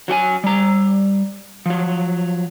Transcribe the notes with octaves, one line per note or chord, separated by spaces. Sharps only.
F#3 F#4 G5 G#5
G3 A#5
F3 F#3